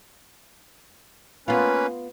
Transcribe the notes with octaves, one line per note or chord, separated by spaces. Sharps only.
A#3 B3 C#4 F4 B4